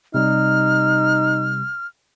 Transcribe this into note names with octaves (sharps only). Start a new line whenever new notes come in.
C3 G3 D#4 F6